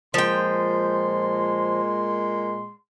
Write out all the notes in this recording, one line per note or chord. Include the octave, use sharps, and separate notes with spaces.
A#2 F3 G#3 G5 C6